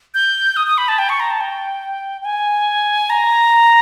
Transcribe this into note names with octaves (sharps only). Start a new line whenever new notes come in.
G6
D#6
D#6
B5
A5
G5
C#6
A#5
A5
G5
G5
G#5
A#5